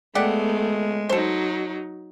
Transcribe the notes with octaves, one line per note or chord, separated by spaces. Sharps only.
G#3 A3 B3 G4 D5 F#5
F#3 D#4 A4 C5